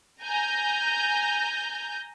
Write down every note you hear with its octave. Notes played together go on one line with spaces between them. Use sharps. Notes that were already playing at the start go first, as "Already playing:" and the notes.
G#5 A#5 G6